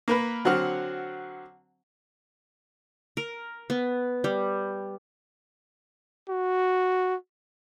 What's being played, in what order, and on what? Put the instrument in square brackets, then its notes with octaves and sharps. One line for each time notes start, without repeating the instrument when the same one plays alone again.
[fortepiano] A#3 A#4 B4
D3 F#3 C4 F#5 F6
[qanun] A#4
B3
G3
[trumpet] F#4